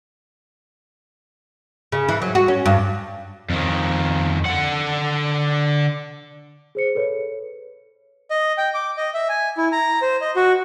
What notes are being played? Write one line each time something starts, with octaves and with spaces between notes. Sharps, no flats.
C#3
E3
F#3
F#4
C#4
G2
F2 D#3
D3 F#5
G#4 C5 C#7
A4 B4 C#5
D#5
G5
D6
D#5
E5
G#5
E4
A#5
C5
D#5
F#4